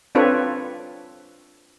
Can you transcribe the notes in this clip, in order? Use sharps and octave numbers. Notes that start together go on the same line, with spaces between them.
C4 D4 F4 A4 B4 C#5